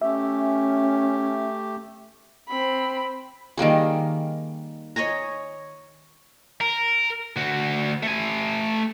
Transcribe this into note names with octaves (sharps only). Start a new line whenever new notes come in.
A3 C#4 G4 E5
C4 B5
D#3 G3 A#3 G#4
C#5 D#5 G#5 A#5
A#4
D2 F#4
A3 G#5